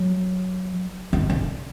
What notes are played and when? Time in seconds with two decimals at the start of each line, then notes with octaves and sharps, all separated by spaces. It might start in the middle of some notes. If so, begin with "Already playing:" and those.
Already playing: F#3
1.13 D#3
1.30 D3